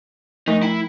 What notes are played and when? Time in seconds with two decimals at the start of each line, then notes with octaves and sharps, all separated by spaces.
0.48 F3 A3 D#4
0.63 E4 G5 A#5